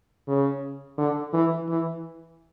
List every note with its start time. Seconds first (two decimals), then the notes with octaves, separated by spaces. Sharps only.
0.28 C#3
0.98 D3
1.33 E3
1.68 E3